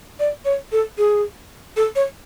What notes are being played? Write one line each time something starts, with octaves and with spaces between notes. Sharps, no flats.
D5
C#5
A4
G#4
A4
C#5